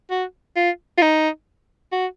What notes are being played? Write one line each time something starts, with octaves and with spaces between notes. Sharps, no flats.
F#4
F4
F4
D#4
F#4